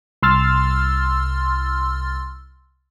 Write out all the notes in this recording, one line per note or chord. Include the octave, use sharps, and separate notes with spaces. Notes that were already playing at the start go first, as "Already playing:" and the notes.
C2 C6 E6 F6 A6